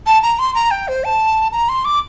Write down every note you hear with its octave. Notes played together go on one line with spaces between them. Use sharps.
A5
A#5
C6
A#5
G5
C5
A5
A#5
C6
D6